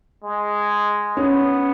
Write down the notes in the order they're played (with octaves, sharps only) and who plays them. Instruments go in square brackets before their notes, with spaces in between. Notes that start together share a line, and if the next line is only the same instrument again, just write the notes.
[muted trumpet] G#3
[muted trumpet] B3 [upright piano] C#4